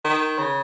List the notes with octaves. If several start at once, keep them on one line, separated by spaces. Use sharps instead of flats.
D#3
C#3